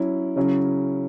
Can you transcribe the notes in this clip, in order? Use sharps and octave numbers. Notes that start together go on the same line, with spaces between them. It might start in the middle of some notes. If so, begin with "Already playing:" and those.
Already playing: F#3 C#4 E4
C#3 F#3 C#4 E4